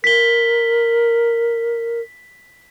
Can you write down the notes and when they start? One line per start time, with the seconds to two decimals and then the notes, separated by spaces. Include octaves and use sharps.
0.04 A#4 B6 G7